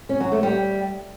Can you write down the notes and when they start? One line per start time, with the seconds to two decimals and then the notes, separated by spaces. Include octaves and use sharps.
0.09 C#4
0.20 F#3
0.32 A3
0.43 G3